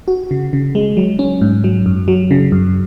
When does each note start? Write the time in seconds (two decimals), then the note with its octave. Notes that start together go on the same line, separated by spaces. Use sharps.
0.08 F#4
0.31 C#3
0.53 C#3
0.75 G#3
0.97 F#3
1.19 C#4
1.41 G#2
1.64 F#3
1.86 F#2
2.08 F#3
2.31 C#3
2.52 F#2